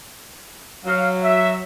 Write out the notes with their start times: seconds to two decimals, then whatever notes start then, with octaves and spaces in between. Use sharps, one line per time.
0.86 F#3 F5
1.23 E5